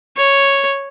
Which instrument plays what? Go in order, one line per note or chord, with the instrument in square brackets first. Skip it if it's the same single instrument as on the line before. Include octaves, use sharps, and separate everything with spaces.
[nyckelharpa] C#5